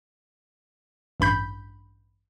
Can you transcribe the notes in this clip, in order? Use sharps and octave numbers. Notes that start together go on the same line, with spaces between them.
A1 G2 B5 G6 B6